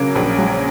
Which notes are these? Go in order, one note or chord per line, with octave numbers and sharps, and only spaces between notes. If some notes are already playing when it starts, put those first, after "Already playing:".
Already playing: C#3 F#3 A#3
A#1
F#3